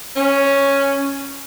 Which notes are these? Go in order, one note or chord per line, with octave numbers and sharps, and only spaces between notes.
C#4